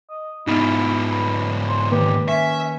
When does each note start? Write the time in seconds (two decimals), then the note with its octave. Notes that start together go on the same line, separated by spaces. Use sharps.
0.10 D#5
0.47 G#2 B3 D#4 E4 F6
1.09 B4
1.68 C5
1.91 D#3 A#3 G4 B4
2.28 C#4 E5